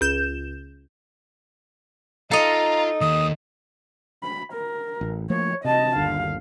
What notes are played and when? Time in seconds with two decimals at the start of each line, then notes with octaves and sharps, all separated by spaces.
0.01 C#2 G6 E7
2.31 D#4 F4 A4 D#5 F5 A#5
3.01 D#2 D#6
4.23 B5
4.53 A#4
5.01 A1
5.30 F3 A3 A#3 C#5
5.65 C3 D#5 A5
5.96 G1 D#2 D3 F5